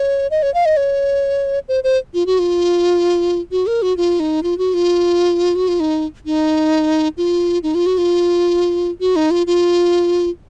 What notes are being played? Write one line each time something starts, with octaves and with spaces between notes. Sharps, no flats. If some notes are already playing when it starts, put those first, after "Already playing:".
Already playing: C#5
D#5
C#5
F5
D#5
C#5
C5
C5
F4
F#4
F4
F#4
A#4
F#4
F4
D#4
F4
F#4
F4
F#4
F4
D#4
D#4
F4
D#4
F4
F#4
F4
F#4
D#4
F4
F4